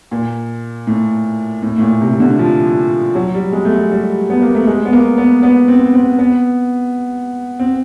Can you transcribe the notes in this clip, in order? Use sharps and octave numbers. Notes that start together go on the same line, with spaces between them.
A#2
A2
A2
A2
A#2
C3
D3
F3
F#3
G3
G#3
A3
G#3
G3
B3
A#3
A3
G#3
B3
A#3
B3
B3
C4
C4
B3
C4